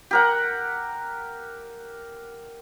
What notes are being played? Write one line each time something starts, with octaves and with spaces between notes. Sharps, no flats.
G4 A#4 F#5